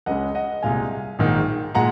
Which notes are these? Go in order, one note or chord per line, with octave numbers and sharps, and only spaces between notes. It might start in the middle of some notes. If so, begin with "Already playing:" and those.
C#2 C#3 G#3 D#5 F#5
D#5 F#5
C2 A#2 G#3 F5 G#5
A#1 G#2 D#3
A#2 G#3 F#5 A#5